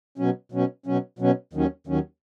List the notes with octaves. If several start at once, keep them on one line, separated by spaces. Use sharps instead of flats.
B2 F#3 C#4
B2 F#3 C#4
B2 F#3 C#4
B2 F#3 C#4
D#2 D#3 F#3 C#4
D#2 D#3 F#3 C#4